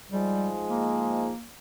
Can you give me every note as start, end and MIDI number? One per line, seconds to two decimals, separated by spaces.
0.11 1.32 44
0.11 1.32 53
0.11 0.50 55
0.11 1.32 56
0.70 1.46 58